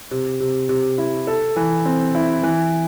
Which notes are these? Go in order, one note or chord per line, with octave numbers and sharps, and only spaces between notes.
C3
C3
C3
E4
A4
E3
C4
E4
E3